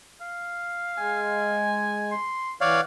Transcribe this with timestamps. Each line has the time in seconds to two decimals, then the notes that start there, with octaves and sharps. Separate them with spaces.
0.21 F5
0.98 G#3 G#5
2.11 C6
2.61 E3 C#5 D5 F5 F#5